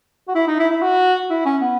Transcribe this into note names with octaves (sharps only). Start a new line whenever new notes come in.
F#4
E4
D#4
E4
E4
F#4
E4
C#4
B3